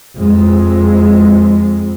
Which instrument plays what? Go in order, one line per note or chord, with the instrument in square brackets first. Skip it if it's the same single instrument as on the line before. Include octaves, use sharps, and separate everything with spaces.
[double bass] F2 G#3